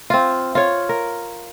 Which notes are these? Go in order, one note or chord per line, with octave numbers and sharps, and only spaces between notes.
C4 F4
F4 C#5
A#4